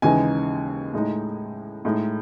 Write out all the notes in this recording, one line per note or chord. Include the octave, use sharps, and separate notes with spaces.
D#2 C#3 E3 G#3 D#4 G#5
A2 G#3 D#4
A2 G#3 D#4